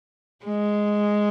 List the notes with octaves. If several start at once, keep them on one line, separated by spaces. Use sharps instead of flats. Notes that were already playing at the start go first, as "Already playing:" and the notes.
G#3